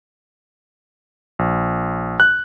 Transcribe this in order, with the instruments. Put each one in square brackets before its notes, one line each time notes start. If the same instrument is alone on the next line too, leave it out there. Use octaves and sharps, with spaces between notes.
[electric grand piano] A#1
F#6